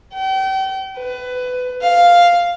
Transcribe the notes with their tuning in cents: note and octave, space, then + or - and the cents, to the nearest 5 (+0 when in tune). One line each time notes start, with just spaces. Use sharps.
G5 -40
B4 +20
F5 +0